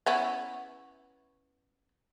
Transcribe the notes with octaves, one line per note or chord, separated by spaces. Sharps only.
B3 C#4 E4